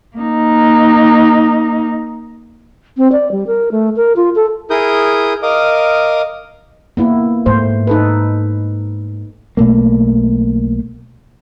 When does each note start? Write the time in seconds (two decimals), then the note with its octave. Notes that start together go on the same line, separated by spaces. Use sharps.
0.17 A#3 D#4
2.97 C4
3.12 D5
3.31 G3
3.47 A#4
3.71 A3
3.96 A#4
4.16 F4
4.35 A4
4.70 E4 G#4 A#4 D#6 G6
5.43 A#4 D#5 F5 D6 D#6
6.97 C#3 A#3 B3 E4
7.46 G#2 A3 C5
7.87 D#4 A4 B4
9.57 B1 B2 A3 A#3